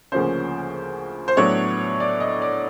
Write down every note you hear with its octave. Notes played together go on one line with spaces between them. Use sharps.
D2 C#3 F3 A#3 C#4 C5
C5
A2 F#3 B3 D4 C#5
D5
D#5
D5